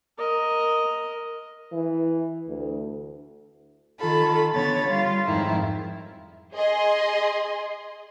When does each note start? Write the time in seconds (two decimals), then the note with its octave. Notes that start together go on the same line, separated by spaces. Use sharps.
0.18 A#4 D#5
1.72 E3
2.48 D2
3.99 D#3 F4 A4 B5
4.53 D3 B3 C#5 B5 A6
4.88 G3 F4
5.25 F2 G#2 D#3 E4
6.56 G#4 D#5 C6